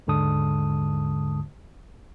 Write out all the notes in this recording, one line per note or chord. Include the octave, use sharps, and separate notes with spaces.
D#2 G#2 D3 G#3 A5 D#6